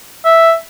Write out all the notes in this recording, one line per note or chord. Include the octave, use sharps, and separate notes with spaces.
E5